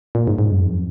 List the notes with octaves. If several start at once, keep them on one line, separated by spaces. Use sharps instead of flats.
A#2
G#2
G#2
F#2
F2